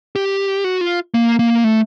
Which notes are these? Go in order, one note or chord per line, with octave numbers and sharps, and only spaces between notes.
G4
F#4
F4
A#3
A#3
A3